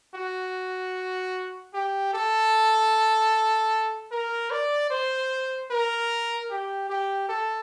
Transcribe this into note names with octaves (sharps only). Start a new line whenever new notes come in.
F#4
G4
A4
A#4
D5
C5
A#4
G4
G4
A4